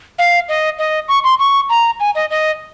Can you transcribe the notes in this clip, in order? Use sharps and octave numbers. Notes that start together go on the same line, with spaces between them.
F5
D#5
D#5
C#6
C6
C#6
A#5
G#5
D#5
D#5